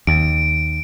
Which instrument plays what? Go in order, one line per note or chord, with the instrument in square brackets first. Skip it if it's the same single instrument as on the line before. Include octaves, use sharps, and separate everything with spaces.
[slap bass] D#2 [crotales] D7